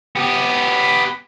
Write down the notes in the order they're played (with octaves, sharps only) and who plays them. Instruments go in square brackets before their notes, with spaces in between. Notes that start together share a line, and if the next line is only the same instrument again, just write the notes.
[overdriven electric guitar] B3 G4